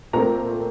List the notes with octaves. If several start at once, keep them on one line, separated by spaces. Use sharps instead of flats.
A#2 A3 C4 A#4 A#5